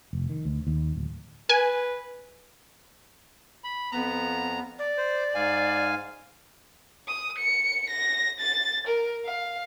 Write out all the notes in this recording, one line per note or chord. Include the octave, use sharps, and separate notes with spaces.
F1
D#3
D2
D#2
D1
B4 G#5
B5
F2 B3 A#5
D5
C5
G#2 F5 G#5
D#6
C#7
A#6
A6
A#4
F5